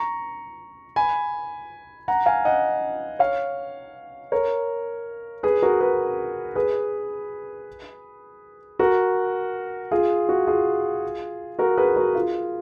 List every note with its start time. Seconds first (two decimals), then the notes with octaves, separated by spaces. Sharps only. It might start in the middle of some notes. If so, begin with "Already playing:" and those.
Already playing: A#5 C#6
0.96 G#5 B5
2.08 F#5 A#5
2.26 F5 G#5
2.45 D#5 F#5
3.19 C#5 F5
4.32 A#4 C#5
5.43 G#4 B4
5.62 F#4 A#4
5.81 G#4 B4
6.55 G#4 B4
8.79 F#4 A#4
9.91 F4 G#4
10.29 F#4
10.47 F4 G#4
11.59 F#4 A#4
11.78 G#4 B4
11.96 F#4 A#4
12.15 F4 G#4